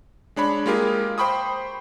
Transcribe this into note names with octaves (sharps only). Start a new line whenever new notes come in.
G#3 D4 C#5 B5
G#3 A#3 F4 G4 G#4 A#4
C5 G5 B5 C#6 D#6